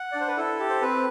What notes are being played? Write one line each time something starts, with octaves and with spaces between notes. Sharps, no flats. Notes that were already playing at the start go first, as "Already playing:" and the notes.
Already playing: F#5
D4 D5
C5
B4
E4 A4
G4
C5
C4 B4